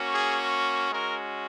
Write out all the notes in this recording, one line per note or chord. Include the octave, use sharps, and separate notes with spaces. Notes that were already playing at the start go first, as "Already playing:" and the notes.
Already playing: A#3 C#4 F#4
G#4
G#3 C#4 F#4 A#4